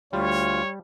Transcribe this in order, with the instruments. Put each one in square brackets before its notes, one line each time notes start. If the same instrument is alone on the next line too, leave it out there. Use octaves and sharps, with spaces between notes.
[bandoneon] D2 F4 [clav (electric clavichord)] G3 [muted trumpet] C#5